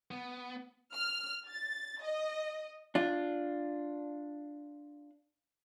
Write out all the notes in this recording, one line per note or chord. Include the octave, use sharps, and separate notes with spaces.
B3
F6
A6
D#5
D4 F4